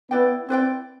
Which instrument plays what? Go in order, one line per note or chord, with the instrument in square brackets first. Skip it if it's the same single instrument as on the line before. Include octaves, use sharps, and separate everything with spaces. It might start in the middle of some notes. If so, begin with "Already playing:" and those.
[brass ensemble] B3 [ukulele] E4 B4 D5 G5
[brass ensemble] C4 [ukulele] E4 B4 D5 G5